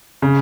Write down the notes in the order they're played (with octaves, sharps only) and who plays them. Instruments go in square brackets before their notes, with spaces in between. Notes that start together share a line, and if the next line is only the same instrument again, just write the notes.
[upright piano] C#3